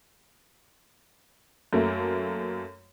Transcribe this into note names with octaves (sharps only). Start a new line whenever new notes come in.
F#2 A3 A#3